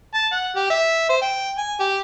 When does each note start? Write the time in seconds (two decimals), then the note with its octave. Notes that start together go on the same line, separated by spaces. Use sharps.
0.14 A5
0.32 F#5
0.56 G4
0.70 E5
1.09 C5
1.22 G5
1.58 G#5
1.80 G4